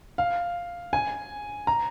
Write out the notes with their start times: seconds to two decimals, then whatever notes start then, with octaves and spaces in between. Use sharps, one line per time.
0.18 F5
0.93 G#5
1.67 A#5